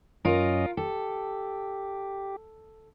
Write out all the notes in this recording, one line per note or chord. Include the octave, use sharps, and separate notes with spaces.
F#2 C#4 F4 A#4 D#5
G4 A4